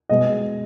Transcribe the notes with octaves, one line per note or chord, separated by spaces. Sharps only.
B2 G#3 D#5